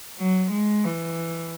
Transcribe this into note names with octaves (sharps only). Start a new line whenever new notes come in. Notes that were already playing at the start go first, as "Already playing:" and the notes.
F#3
G#3
E3